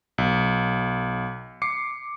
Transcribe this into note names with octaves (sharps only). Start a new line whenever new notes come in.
B1
D6 C7 C#7